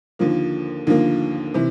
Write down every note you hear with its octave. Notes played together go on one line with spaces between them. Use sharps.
D#2 D3 F3 A#3
D#2 D3 F3 A#3
C3 E3